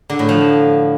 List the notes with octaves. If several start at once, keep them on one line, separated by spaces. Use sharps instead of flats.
D3
A2
F3